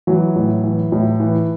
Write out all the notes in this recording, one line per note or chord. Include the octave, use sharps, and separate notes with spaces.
E3 F#3
A2
E3
A2
E3